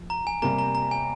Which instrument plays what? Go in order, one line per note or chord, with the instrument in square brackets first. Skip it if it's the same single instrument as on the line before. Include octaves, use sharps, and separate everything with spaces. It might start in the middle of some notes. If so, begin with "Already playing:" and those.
Already playing: [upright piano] F3
[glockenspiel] A#5
G#5
[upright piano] C3 G3 A#3 [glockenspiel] A#5
[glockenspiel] A#5
A#5
G#5